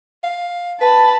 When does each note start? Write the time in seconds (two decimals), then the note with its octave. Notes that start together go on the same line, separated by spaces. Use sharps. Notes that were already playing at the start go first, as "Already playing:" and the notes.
0.23 F5
0.81 B4 A5 B5